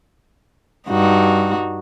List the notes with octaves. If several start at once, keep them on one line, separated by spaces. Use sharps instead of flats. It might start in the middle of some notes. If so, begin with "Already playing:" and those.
G2 D#4 F#4